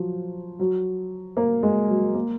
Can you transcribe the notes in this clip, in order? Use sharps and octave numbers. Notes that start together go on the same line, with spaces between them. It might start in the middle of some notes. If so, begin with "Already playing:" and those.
Already playing: F3 F#3
F#3
A#3
G#3
F#3
A#3